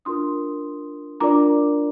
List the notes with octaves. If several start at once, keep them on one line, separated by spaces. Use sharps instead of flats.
D4 F4 A#4 C6 D#6
D4 F4 A#4 D5 A#5 D6